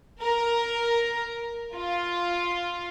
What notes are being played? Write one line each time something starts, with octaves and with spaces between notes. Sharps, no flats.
A#4
F4